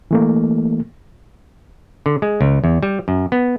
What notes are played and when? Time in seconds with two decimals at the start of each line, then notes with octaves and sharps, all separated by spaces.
0.11 E3 A3 A#3
2.06 D3
2.22 G#3
2.41 C#2
2.64 E2
2.83 G3
3.08 F#2
3.32 B3